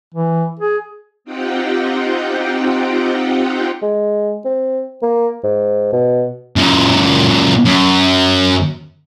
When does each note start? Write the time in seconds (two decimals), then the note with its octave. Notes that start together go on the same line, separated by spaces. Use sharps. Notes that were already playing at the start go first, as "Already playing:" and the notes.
0.14 E3
0.60 G#4
1.24 C4 D#4 F4 G4 F#5 G5
3.82 G#3
4.45 C4
5.02 A#3
5.44 G#2
5.93 B2
6.56 F#2 A#2
7.66 F#2